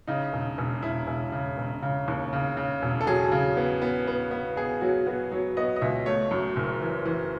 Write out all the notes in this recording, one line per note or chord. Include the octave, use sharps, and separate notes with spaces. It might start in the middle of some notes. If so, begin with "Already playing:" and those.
C#3 D#4
E1
E1
E1 E4
E1
C#3
E1
C#3
D#2
C#3
C#3
E1
A4
F#3 G#4
C#3
B3
B3
B3
B3
B3 G#4
F#3 F#4
B3 F#4
F#3 C#5
B3 D#5
D#5
C#2 E5
A3 C#5
F#2
F#1
E3
E3